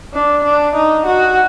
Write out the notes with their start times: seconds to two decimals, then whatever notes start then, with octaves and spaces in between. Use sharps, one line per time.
0.14 D4
0.44 D4
0.75 D#4
1.06 F#4